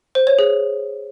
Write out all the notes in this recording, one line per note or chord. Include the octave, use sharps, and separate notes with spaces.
C5
C#5
G#4